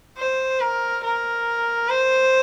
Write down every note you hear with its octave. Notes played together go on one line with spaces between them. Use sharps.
C5
A#4
A#4
C5